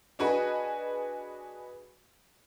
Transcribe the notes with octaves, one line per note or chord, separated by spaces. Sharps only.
D4 F#4 G#4 B4 D#5